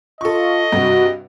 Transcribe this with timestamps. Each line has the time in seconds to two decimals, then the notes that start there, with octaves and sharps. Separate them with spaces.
0.21 F4 A4 D#5 C#6
0.72 G2 C3 F#4